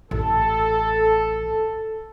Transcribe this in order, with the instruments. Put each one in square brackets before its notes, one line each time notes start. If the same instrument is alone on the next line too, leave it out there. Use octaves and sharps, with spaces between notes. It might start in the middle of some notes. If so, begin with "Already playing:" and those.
[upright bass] A1 [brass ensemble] A4